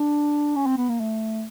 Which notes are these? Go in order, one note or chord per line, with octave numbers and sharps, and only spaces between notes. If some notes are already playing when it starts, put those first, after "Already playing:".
Already playing: D4
C#4
C4
B3
A#3
A3